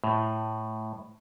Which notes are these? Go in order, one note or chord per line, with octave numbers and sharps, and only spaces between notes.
A2